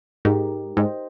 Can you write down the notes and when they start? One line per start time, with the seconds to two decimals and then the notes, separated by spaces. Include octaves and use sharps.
0.25 G#2 D#4 G4 A#4
0.77 G#2 C5 D#5 G5